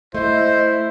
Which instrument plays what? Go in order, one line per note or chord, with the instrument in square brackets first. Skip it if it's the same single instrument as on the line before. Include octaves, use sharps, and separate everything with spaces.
[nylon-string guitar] A3 [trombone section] E4 [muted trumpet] C5 [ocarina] D#5